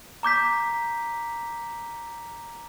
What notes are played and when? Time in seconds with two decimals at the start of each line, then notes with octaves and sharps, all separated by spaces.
0.23 A#5 D6 G6 B6